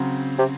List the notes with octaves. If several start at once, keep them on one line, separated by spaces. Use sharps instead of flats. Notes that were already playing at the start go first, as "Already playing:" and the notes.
Already playing: C#3 F#3 C4
C3